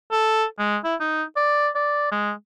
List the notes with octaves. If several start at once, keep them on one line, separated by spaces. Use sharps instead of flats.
A4
G#3
E4
D#4
D5
D5
G#3